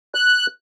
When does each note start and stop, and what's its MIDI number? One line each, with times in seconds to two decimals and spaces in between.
0.15 0.46 90